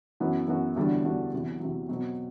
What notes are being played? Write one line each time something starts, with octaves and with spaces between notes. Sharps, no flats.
F#2 E3 B3 F#4
F#2 E3 B3 F#4
E2 D3 G3 D4 F#4
E2 D3 G3 D4 F#4
E2 C3 F#3
E2 C3 F#3
B2 F#3 C4